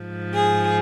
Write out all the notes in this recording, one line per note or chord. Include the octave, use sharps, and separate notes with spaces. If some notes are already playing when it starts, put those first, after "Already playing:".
Already playing: G#2 F3
G#4